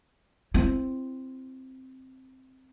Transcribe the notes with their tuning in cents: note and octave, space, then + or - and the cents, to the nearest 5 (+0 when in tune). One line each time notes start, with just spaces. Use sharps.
C4 +0 E4 +30